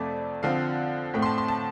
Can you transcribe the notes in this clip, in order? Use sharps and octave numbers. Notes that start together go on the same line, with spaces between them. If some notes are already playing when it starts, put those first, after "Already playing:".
Already playing: F2 C3 A3 D5
D3 F3 C4 F5
A2 A3 C4 G5
C6
A5
C6
A5